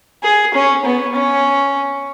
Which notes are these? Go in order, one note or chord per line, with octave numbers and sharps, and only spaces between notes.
G#4
C#4
B3
C#4